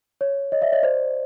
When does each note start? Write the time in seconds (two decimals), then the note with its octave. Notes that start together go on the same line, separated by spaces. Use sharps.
0.21 C#5
0.52 C#5 D#5
0.62 D5 E5
0.72 C#5 D#5
0.83 C5 D5